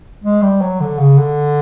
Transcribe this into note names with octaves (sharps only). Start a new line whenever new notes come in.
G#3
G3
F#3
D3
C#3
D3